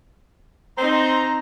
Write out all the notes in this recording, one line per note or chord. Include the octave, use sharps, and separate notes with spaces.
C4 D#4 C5 A#5